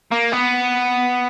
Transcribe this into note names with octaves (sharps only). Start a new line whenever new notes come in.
A#3
B3